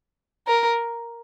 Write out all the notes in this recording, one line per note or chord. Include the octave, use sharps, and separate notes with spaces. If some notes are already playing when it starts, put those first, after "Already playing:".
A#4